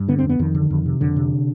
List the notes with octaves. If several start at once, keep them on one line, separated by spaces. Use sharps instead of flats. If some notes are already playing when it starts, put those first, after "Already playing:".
Already playing: G2
D3 B3
C4
F2
B3
F2 D#3
D3
F2
C3
F2 D3
C3